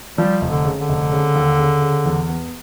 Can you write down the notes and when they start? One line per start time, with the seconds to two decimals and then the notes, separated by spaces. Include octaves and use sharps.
0.18 F3 G3
0.41 F1
0.50 D3
0.65 C#3
0.81 D3
0.89 F1
1.12 C#3
1.35 D#2
1.59 C#3
1.82 C#3
2.06 E2
2.29 B3